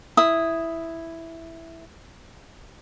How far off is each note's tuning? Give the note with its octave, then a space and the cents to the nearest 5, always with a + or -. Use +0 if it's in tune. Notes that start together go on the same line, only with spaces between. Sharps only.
E4 +0 D#6 +0